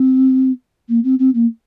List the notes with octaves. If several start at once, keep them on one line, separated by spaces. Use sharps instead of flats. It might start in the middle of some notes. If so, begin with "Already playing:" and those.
Already playing: C4
A#3
C4
C4
A#3